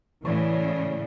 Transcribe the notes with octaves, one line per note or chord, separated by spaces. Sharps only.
A2 C#3 E3 D5 C#6